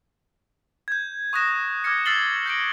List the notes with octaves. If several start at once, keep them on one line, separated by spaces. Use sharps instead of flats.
G6 G#6
C#6 D#6 F#6 A#6 E7
A#6
D6 F6 G#6 A#6 C#7
E6 F6 A6 C7 F#7 G7
G6 A#6 D7